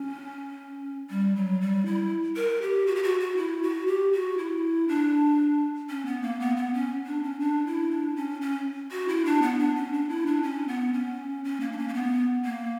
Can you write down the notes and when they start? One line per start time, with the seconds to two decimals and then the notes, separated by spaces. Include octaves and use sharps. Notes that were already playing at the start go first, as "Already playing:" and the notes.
Already playing: C#4
1.10 G3
1.36 F#3
1.61 G3
1.86 E4
2.36 A#4
2.62 G4
2.87 F#4
2.95 G4
3.03 F#4
3.20 F#4
3.37 E4
3.62 F#4
3.87 G4
4.12 F#4
4.38 E4
4.88 D4
5.90 C#4
6.06 B3
6.22 A#3
6.40 B3
6.57 B3
6.73 C#4
7.06 D4
7.23 C#4
7.40 D4
7.66 E4
7.91 D4
8.16 C#4
8.41 C#4
8.91 F#4
9.08 E4
9.25 D4
9.42 B3
9.59 D4
9.76 C#4
9.93 D4
10.09 E4
10.26 D4
10.42 C#4
10.68 B3
10.93 C#4
11.44 C#4
11.60 A#3
11.72 D4
11.78 C#4
11.88 A#3
11.94 B3
12.45 A#3